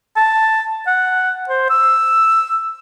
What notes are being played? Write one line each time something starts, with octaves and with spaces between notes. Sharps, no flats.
A5
F#5
C5
E6